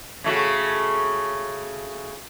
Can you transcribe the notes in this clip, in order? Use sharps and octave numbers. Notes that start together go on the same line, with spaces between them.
C#3 A3 F#4